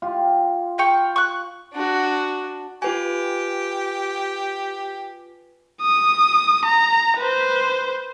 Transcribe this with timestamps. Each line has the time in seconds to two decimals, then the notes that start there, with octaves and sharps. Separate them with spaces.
0.02 F4 G4
0.78 F5 G5 C#6
1.16 C#6 F#6
1.74 D4 F#4
2.82 F4 G4 B4 G#5
5.82 D#6
6.65 A#5
7.17 B4 C5